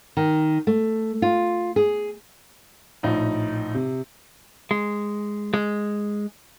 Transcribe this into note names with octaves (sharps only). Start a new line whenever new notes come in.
D#3
A3
F4
G#4
A#1 A2 D#4
C3
G#3
G#3